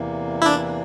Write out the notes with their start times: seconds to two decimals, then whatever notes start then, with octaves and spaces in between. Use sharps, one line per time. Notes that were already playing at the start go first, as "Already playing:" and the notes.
Already playing: E2 C3 E3 A#3
0.42 E4
0.46 D4